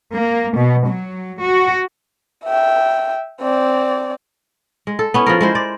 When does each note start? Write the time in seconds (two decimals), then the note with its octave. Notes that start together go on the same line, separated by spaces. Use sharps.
0.14 A#3
0.56 B2
0.86 F#3
1.41 F#4
2.45 E5 G5
3.41 C4 D5
4.87 G#3
4.99 A4
5.14 B3 C#4 E4
5.26 F3 G#4 A#4
5.41 G#3 E4 C5
5.55 D5